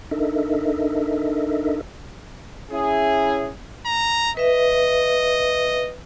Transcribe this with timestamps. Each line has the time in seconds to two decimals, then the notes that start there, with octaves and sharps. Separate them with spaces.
0.11 D4 D#4 A4 A#4 D#5 E5
2.71 C#4 E4 G#4
3.86 A#5
4.37 B4 D#5 E5